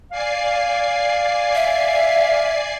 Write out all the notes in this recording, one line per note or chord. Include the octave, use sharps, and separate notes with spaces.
D5 F5 G#5 C7
E5